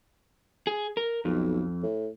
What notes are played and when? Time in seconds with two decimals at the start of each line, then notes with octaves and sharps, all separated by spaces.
0.67 G#4
0.97 A#4
1.25 B1 F2
1.83 A2